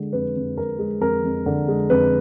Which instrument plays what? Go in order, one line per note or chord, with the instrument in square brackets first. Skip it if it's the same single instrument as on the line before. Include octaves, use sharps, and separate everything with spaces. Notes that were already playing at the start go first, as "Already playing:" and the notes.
Already playing: [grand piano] D3 G#3
F2 B4
F2
D3 A#4
G#3
F2 A#4
F2
D3
G#3
F2 B4